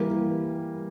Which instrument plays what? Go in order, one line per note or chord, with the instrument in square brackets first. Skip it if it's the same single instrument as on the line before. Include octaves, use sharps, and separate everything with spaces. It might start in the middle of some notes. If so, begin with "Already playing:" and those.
Already playing: [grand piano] E3 G3 A#3